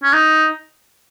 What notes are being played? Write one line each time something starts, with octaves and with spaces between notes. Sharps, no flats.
C#4
D#4